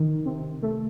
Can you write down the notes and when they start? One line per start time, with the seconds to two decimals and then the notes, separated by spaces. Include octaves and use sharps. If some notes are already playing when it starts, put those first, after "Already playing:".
Already playing: D#3
0.26 C3
0.63 A3